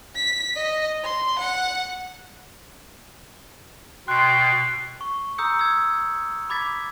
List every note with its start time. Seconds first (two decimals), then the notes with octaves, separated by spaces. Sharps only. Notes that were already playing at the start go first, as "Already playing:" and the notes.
0.15 B6
0.56 D#5
1.04 C6
1.39 F#5
4.08 B2 G5 C6 F#6 C7
5.01 C#6
5.38 A#5 D#6 E6 G6 C#7
5.59 E6 G#6
6.50 B5 D6 G#6 A6 B6